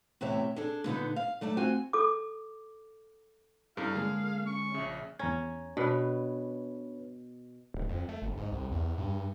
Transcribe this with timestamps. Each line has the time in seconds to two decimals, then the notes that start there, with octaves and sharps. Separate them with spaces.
0.21 E2 A2 C3 G4 C#5 E5
0.56 D4 G#4 A4
0.84 A#2 D3 B3 D#4
1.16 F5
1.41 F#2 A3 D5 A5
1.57 C4 F4 F#4 G#5
1.93 A4 D6
3.77 G2 C#4 E4 A4 A#4 F5
3.95 D3 G#3 A#3 G#4
4.46 C#4 C#6
4.74 A#1 C#3 E5
5.19 E2 C#4 A#5 G#6
5.77 B2 D4 B4 C#5
7.74 D1
7.89 F2
8.09 A3
8.22 G1
8.37 G#2
8.52 C2
8.72 E2
8.98 G2